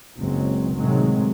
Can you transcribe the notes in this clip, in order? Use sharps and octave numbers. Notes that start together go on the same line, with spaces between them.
F#1 C#2 F#3 G#3 C4
A2 C3 D#3 F#3 G#3 C4